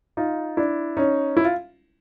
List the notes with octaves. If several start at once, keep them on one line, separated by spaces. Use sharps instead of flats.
D#4 F4
D4 E4
C#4 D#4
E4
F4